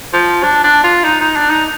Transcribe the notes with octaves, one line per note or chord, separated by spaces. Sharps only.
F3
D4
D4
F4
D#4
D#4
D4
D#4